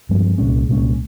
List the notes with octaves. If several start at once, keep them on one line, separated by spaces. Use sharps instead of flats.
G2 F3 G#3 C4
C2 A#2 G#3 C#4
C2 A#2 G#3 C#4